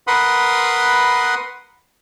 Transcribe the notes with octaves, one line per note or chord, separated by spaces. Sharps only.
A#4 B4 F#5 B5 C6 D#6